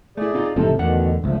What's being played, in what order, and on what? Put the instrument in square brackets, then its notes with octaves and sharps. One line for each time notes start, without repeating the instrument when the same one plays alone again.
[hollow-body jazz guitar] A3 E4 [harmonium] G#4 D5
[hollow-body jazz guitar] C4 D#4 F4
[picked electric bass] F#1 A2 C4 [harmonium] C3 A4 [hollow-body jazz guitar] F3 D#4
[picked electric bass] E2 [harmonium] B2 D#3 [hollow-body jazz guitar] D3 A3 F#5
[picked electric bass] G1 C#2 [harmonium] D3 F3 A3